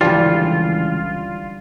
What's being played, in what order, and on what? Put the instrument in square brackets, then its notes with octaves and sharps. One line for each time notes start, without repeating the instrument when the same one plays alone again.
[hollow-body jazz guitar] C#2 E3 [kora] D3 F3 G3 [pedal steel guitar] F4